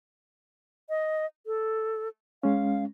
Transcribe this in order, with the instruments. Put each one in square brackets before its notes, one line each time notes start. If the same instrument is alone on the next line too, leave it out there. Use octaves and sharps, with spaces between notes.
[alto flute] D#5
A4
[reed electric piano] G#3 C#4 [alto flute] F5